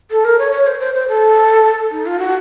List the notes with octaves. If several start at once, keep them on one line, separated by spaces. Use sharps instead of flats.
A4
A#4
C#5
C#5
C5
C5
C5
A4
D#4
F4
F#4